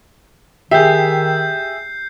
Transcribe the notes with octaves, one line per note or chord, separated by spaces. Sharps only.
D#3 G4 G#4 E5 G6 C7